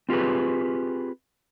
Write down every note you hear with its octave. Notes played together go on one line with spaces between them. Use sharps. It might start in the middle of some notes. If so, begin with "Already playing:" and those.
C4 F4 G4 G#4 B4